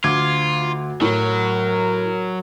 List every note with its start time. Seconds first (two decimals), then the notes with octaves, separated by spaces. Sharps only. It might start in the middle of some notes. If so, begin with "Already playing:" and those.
0.04 D2 F4 D6 G#6
1.01 A2 F#3 A#4